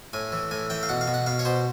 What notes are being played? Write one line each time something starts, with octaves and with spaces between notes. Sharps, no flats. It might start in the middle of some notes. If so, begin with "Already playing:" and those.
A2 G#5
E3
A2 G#5
E3 G5
F5
B2 F#5
F5
B2
F#5
B2 F5
C#5
B2 C5